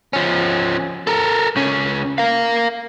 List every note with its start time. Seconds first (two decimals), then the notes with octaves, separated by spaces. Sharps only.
0.13 F3 C#4
1.07 A4 A#4
1.56 C#2 C#4
2.18 A#4 F5